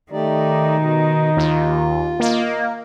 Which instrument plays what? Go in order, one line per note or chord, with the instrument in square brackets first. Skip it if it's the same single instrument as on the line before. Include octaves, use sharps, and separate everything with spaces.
[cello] D#3 [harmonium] A3 G4 D5 [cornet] D#4
[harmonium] B2
[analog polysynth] D#2 [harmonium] F4
[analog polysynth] A#3 [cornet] D#5